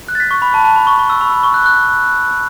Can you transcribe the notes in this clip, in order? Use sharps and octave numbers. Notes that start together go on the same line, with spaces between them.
F#6
A6
B6
C#6
B5
A5
A5
B5
C#6
C#6
E6
B5
C#6
F#6
F#6